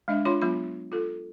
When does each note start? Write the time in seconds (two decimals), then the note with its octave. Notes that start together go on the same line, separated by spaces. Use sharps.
0.08 G#3 D4 D#5 E5
0.25 D4 F4 C#5 B5 C6
0.42 F#3 B3 F4 B5
0.92 F4 A4